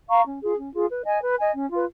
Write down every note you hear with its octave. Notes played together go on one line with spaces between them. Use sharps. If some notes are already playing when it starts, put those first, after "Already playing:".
F5 A#5 C#6
C#4
F4 G#4
C#4
F4 G#4
B4
D#5 G#5
B4
D#5 G#5
C#4
F4 B4